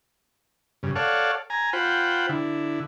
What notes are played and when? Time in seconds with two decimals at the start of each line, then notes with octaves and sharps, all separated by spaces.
0.83 G2 C#3
0.96 A4 C#5 D5 F5 F#5
1.50 G#5 A#5
1.73 F4 C5 F#5 G5 B5
2.29 D3 E4